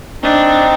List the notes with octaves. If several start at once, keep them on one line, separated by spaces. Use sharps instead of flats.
C4 D4 D#4